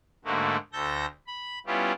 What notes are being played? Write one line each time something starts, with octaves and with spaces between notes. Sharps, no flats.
G#2 D3 A3 A#3 F#4
D2 A4 G6 A#6
B5
G3 B3 C#4 E4 F4 G4